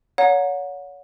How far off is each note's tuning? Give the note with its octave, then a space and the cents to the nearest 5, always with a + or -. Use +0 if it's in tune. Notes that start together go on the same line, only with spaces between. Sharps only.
C#5 +30 F#5 -30 A#5 +0